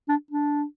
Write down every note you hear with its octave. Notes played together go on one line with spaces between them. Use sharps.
D4
D4